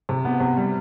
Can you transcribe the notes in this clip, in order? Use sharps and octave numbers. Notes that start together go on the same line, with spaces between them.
C3
B3
C3
G3